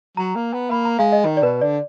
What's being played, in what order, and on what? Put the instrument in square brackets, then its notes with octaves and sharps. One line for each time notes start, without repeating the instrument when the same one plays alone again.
[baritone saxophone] F#3 [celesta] A#5
[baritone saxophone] A#3
B3
[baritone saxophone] A#3 [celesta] B5
[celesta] A#5
[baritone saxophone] G#3 [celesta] F5
[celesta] D#5
[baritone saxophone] D#3
[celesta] D5
[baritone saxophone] B2 [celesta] B4
[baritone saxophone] D3 [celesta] D5